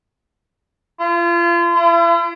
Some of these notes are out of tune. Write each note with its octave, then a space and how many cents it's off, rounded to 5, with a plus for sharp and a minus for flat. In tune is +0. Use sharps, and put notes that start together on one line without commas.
F4 -35
E4 +45